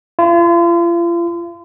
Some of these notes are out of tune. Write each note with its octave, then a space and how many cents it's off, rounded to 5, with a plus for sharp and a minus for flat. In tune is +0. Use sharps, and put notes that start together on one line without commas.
F4 -40